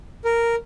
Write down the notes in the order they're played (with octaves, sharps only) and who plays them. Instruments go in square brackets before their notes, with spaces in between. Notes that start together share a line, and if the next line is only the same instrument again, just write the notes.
[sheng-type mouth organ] A#4